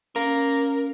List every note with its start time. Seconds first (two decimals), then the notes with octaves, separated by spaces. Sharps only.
0.16 A#3 C#4 A#4